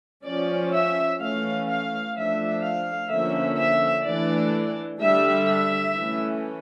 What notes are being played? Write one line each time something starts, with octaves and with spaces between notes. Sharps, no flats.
F3 C#4 D5
E5
E3 A3 C#4 F5
F5
F3 A3 D4 E5
F5
D3 F3 A#3 C#4 E5
E5
E3 A3 D4 D5
D3 G3 D4 E5
E5
E3 A3 C#4